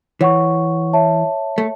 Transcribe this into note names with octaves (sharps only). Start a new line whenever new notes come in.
E3 C#5 F#5 C#6
C#5 E5 A5
A3